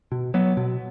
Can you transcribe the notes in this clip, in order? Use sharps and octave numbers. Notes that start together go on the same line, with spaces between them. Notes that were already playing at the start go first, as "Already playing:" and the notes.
B2
F#3 B3
B2